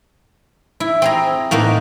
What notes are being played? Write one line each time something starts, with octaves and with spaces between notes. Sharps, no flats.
E4
C4 G#4 A#5
A2 A#3 B3 D#4